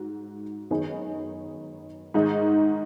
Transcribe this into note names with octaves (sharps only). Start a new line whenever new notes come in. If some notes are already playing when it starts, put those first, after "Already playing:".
Already playing: G#2 F#4
F#2 D#3 B3 D#4 G#4
G#2 D#3 G#3 D#4